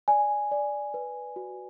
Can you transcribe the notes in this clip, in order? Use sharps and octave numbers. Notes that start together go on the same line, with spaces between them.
D5 G#5
D5
B4
F#4